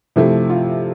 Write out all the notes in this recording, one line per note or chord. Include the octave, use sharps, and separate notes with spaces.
C3 F3 A3 E4
F4